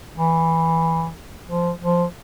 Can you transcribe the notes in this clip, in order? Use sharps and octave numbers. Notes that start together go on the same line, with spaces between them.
E3
F3
F3